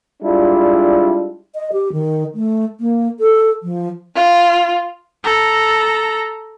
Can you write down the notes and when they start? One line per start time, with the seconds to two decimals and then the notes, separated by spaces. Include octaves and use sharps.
0.23 G3 G#3 D4 E4 F4
1.55 D#5
1.73 G4
1.93 D#3
2.35 A3
2.80 A#3
3.20 A4
3.63 F3
4.15 F4
5.23 A4 A#5